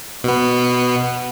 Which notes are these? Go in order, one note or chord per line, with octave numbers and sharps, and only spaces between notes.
B2 B3